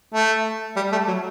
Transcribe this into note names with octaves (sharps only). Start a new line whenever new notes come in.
A3
G3
A3
F#3